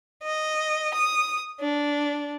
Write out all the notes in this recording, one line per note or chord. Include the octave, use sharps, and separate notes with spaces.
D#5
D#6
D4